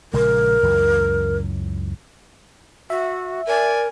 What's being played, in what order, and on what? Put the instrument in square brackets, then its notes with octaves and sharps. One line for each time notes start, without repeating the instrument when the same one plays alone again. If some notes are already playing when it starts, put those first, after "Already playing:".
[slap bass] A#1 C#3 G#3 [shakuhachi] A#4
[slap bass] C#2 F#2 E3
[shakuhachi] F#4 [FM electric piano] E5
[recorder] A#4 [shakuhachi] D5 [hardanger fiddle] G#5